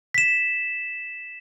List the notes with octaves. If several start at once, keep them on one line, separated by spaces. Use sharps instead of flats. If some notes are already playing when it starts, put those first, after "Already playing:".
B6 E7